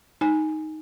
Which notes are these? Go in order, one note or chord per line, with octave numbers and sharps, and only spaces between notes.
D#4 G#5